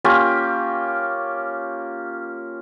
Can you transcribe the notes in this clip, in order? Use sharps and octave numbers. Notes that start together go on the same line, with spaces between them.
A#3 C#4 F4 G4